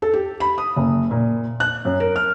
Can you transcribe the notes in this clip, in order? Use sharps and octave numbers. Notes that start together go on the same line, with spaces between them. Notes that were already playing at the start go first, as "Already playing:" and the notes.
A4
G4
B5
D#6
F#1
A#2
F#6
F#2
A#4
F6